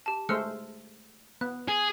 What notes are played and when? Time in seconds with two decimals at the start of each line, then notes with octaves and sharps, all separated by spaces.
0.06 G4 A5
0.29 G#3 A3 C5 E6 F6 C#7
1.41 B3 F#6
1.68 G#4